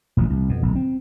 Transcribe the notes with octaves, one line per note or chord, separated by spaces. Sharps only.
D#1 A1 F3
C2
F2 B2
D1 B1
C4